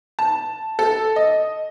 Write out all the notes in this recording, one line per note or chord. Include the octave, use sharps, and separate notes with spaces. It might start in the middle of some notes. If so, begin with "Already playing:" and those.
A5
A4
D#5